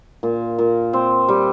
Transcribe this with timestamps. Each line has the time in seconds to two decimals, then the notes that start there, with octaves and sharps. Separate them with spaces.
0.23 A#2
0.58 A#2
0.93 C4
1.28 G3